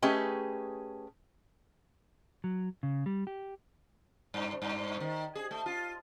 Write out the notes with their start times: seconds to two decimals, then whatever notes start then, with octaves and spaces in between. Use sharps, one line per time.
0.02 A3 C#4 G4 G#4 B4 D#5
2.44 F#3
2.83 C#3
3.06 G3
3.27 G4
4.34 G2
4.62 G2
5.00 D#3
5.35 G#4
5.51 A3
5.66 F4